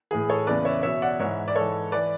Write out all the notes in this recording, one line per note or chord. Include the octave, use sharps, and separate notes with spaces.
A2 E3 G#4
A4 C#5
E2 C#3 E3 B4 D5
C#5 E5
E2 B2 C#5 E5
D5 F#5
G#2 E3 C#5 E5
D5
G#2 E3 A4 C#5
E3 B4 D5